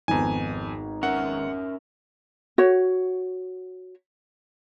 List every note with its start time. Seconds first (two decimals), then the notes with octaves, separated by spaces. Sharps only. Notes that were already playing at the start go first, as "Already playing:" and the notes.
0.08 G#1 F2 B3 G#5 A#5
1.03 C#4 A#4 E5 F#5
2.58 F#4 C#5